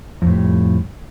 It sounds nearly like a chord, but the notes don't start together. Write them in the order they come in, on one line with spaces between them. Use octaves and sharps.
F2 A2 G3